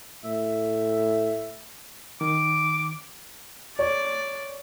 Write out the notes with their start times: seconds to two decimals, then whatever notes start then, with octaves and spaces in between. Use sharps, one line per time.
0.24 A2 E5
2.21 D#3 D6
3.79 C#5 D5